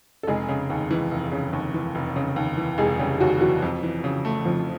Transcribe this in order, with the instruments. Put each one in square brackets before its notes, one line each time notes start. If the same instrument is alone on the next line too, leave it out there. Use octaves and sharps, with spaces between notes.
[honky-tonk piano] A4
[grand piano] F1 [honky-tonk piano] G#3 G#4
[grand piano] C#3
D#2
E3
F1
C#3
D#2
E3
F1
C#3
D#2
E3
[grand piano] F1 [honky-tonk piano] G#3 G#4
[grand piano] C#3 [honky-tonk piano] G3 G4
[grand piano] D#2 [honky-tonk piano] F#3 F#4
[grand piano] E3 [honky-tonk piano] F#3 F#4
[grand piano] F2
E3
C#3
A3
[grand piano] F2 [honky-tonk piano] F3 F4